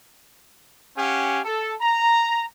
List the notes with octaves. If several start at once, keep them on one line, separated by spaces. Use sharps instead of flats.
C#4 G4 F5 F#5 G#5
A4
A#5